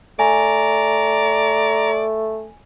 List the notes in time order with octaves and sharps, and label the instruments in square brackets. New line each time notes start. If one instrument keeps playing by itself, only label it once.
[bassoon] A3 [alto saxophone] D5 [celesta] G#5 [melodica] A#5